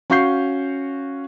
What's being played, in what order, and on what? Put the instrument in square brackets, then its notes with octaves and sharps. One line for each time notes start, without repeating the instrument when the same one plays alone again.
[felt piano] C#4 F#4 F5 C#6 G6 C7